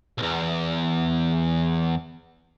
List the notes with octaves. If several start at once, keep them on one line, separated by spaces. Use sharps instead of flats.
B1 E2